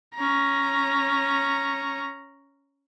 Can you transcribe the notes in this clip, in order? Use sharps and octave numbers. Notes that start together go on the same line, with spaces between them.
C#4 A#5